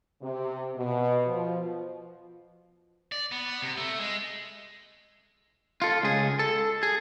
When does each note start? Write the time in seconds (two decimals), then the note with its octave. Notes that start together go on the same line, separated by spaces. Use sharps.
0.22 C3
0.76 B2
1.27 F3
3.12 D5
3.32 B3
3.62 C3
3.77 A3
4.00 G#3
5.82 F4 A4
6.03 C#2 G#4
6.39 A4
6.83 G#4